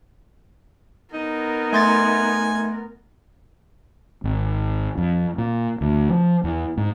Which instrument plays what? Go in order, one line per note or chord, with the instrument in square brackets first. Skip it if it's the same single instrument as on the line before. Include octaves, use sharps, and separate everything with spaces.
[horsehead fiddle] B3 A#4 [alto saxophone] D#4
[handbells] A3 C6 A6 [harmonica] G#5
[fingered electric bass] G#1
F2
A#2
D2
F3
E2
G#2